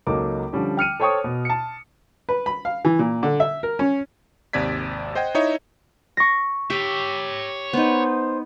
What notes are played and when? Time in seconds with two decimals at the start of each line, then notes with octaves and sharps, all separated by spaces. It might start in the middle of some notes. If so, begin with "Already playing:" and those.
0.07 C#2 F#3 A#3 D#4 A4 D6
0.53 D3 F3 G3 C#4
0.77 G5 F6 C#7 D#7
1.00 A4 C5 C#5 G5 C#6 D#6
1.24 B2
1.45 A5 C#7
2.29 B4
2.46 B5
2.65 F5
2.85 E3
2.99 A#2
3.23 D3
3.40 E5
3.63 A#4
3.79 C#4
4.53 G#1 D#2 C3 D5 G#6 B6
5.15 C5 D#5 F#5 G5 G#6
5.35 D#4 E4 C#5 D#5 E5
6.17 C#6 A#6
6.70 G4 C#5 E5
7.73 B3 D#4 C5